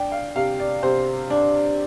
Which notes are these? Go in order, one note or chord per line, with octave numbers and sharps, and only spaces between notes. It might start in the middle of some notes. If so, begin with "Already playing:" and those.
Already playing: D4 G5
F5
C3 F5
D5
C3 C5
D4